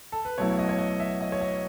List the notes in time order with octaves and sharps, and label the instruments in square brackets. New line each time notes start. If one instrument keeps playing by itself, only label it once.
[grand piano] A4
B4
B1 B2 F#3 A3 E4 C#5
D#5
C#5
D#5
E5
D#5
C#5
D#5